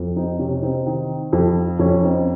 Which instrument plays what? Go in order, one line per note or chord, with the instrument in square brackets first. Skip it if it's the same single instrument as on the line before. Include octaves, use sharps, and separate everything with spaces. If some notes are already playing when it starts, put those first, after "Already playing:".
Already playing: [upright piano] F2
C4 D#4
C3 C#4
C4 D#4
D#3
F2
F2 C#4
C4 D#4